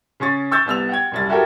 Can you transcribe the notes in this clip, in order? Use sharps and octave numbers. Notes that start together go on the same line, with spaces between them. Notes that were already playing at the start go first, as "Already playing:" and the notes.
C#3 C#4 C#6 A6
C#6 E6 G6 A6
C2 B3 E6 F7
F#5 G5 G#6
F#1 C2 A6
E4 F#4 G4 A4 A#4 G5